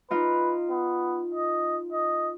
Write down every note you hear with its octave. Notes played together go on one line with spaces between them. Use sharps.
D#4 F4 B4
B3
D#5
D#5